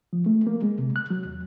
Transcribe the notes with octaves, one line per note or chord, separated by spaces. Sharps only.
F3
A3
A#3
G#3
C3
F#6
F#3
E2